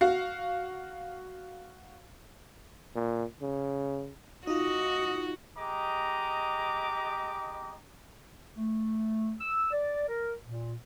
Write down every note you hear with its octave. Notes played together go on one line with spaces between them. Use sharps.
F#4 F5
A#2
C#3
D#4 F4 F#4 D#5
G#3 G4 D#5 A#5 D6
A3
E6
D5
A#4
A#2